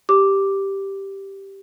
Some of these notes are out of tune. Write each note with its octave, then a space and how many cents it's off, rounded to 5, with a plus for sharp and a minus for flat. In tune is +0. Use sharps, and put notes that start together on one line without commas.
G4 +0 D6 +0